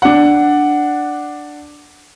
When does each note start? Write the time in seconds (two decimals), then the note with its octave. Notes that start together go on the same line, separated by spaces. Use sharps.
0.02 D4 F#5